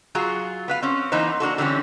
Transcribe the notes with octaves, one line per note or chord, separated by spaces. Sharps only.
F#3 F4 F#4 G#4
B3 B4 F5
C4 C#4
E3 A#3 B3 D#4 C5
A#3 D4 F#4 A4
D3 E3 G3 C4 C#4